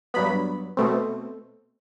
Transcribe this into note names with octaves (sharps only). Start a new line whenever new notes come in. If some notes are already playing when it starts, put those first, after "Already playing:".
G2 F#3 B3 B5
B2 A3 C4